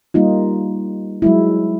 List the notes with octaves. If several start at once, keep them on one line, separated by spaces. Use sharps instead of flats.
G3 A#3 D#4 F4
F#3 G#3 E4